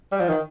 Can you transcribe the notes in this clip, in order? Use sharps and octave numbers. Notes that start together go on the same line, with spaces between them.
G3
F3
D#3